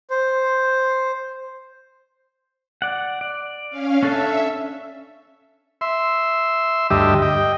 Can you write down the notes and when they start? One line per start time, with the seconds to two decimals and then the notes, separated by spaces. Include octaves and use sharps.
0.10 C5
2.82 D5 F#5
3.21 D5
3.70 C#4 F5
4.03 C#4 D4 A4 E5
5.81 E5 C6
6.90 D2 G2 G4 D#5 E5
7.22 D#5 G5